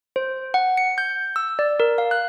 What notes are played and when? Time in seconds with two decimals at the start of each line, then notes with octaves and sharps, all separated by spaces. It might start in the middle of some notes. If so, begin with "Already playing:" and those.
0.16 C5
0.54 F#5
0.77 C#7
0.98 G6
1.36 E6
1.59 D5
1.80 A#4
1.98 F5
2.11 F#6